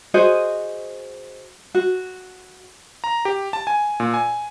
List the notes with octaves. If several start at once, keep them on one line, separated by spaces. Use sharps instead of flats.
F#4 G#4 C5 D#5
F#4
A#5
G4
A5
G#5
A#2
G#5